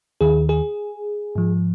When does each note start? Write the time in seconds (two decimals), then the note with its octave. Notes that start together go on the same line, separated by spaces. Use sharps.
0.21 D#2 D#3 G#4
0.49 G#4
1.35 G#2 F3